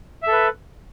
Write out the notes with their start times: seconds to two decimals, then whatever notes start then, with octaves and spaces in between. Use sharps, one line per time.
0.23 E5
0.28 A4
0.32 B4